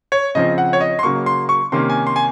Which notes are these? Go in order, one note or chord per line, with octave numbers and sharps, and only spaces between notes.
C#5
C#3 F3 C4 D#5
F#5
C#5
D#5
C6
C#3 F#3 A#3 C#6
C6
C#6
C3 D#3 A#3 C#4 C6
G#5
C6
G#5